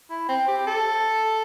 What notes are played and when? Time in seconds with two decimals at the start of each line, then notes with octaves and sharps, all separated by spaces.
0.10 E4
0.29 C4
0.48 G4
0.67 A4